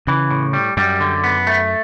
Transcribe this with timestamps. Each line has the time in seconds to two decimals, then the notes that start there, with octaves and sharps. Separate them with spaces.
0.07 C#3 E3
0.30 A2
0.53 G3
0.77 F#2 G3
1.01 D3
1.24 B3
1.47 A3